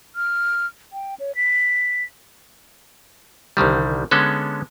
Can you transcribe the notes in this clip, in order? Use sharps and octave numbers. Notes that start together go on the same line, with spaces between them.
F6
G5
C#5
B6
C2 D3 D#3 G3
D3 G#3 B3 C#4 A4